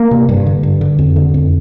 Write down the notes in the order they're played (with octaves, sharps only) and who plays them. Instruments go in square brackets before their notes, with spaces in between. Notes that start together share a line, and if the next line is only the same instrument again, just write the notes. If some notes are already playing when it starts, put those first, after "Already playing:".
Already playing: [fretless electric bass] A#3
C3
G2
D3
G2
D3
F2
D3
F2